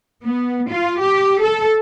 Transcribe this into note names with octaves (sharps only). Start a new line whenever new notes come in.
B3
F4
G4
A4